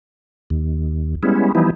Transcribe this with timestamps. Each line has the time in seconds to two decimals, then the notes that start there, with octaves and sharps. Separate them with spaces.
0.50 D#2
1.23 G3 G#3 B3 C#4 E4
1.55 E3 F3 G3 B3 D#4 E4